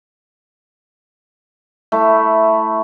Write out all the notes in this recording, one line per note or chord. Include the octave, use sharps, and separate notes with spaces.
A3 E4